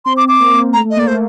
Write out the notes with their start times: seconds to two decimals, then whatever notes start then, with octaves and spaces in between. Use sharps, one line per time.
0.05 C4 C6
0.17 D6
0.28 D6
0.40 A#3
0.73 A3 A#5
0.85 A3
0.90 D#5
0.96 A#3 D5
1.07 A3 C5